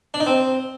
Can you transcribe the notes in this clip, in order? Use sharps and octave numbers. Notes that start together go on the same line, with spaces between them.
D4
D#4
C4